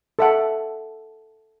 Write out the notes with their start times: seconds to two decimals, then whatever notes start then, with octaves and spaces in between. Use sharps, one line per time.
0.19 A4 E5 F#5